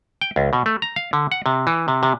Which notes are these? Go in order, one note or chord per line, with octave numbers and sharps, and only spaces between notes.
G5
C#2
B2
A3
A#5
F5
D3
F#5
C3
E3
C3
C3